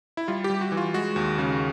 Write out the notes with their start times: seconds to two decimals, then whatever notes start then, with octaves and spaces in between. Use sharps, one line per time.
0.17 E4
0.28 G3 F4
0.44 G4
0.50 G3
0.61 F#4
0.72 E3
0.77 F4
0.94 G#3 F#4
1.16 D#2
1.38 C#3